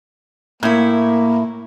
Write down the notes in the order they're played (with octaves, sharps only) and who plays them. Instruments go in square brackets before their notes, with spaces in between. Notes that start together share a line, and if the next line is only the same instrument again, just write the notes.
[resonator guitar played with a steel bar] A2 E4 [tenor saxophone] A#3